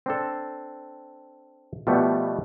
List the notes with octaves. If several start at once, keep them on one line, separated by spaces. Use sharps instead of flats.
C4 D4 A4
B2 F3 G3 A3 B3